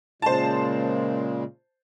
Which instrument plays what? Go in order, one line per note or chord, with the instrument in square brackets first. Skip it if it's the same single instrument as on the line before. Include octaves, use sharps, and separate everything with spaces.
[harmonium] A#2 C#3 G#3 [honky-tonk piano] C5 A5